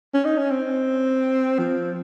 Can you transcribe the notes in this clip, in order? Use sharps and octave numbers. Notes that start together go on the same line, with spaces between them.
C#4
D#4
C#4
C4
F3